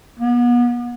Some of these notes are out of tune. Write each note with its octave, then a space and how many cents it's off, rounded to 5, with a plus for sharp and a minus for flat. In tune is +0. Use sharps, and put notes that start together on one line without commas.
B3 -35